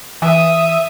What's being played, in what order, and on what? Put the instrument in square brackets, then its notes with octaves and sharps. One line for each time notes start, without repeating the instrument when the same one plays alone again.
[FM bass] E3 [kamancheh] E5 D#6